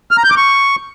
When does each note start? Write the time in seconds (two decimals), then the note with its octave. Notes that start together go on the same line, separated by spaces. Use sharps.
0.11 F6
0.18 A#5
0.24 G6
0.31 D6
0.37 C#6